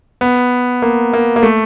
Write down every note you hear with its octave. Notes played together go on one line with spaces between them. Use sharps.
B3
A#3
A#3
A#3
A3